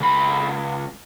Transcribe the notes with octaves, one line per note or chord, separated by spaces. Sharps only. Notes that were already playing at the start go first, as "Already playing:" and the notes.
C#2 B5